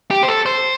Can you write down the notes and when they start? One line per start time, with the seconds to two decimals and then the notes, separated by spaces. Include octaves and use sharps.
0.11 G4
0.23 C5
0.28 A4
0.46 C5